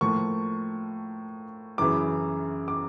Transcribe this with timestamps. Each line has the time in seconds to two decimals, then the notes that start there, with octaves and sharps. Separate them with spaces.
0.01 A2 F3 A#3 C#6
1.78 F#2 C#3 E3 D6
2.68 D6